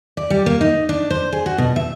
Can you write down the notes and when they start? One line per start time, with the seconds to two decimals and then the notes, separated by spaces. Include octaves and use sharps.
0.17 D5
0.30 G3
0.46 A#3
0.61 D#4
0.89 D4
1.10 C5
1.33 G#4
1.46 F#4
1.58 B2
1.76 E5